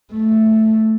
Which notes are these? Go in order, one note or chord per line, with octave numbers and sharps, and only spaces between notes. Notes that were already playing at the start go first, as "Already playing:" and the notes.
A3